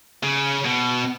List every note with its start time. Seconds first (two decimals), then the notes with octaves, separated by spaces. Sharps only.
0.23 C#3
0.65 B2